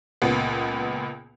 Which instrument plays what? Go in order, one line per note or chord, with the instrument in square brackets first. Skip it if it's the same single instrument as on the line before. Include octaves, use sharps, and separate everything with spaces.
[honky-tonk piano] C#2 A#2 B3